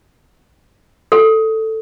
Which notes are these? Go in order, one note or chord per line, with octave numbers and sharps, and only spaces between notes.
A4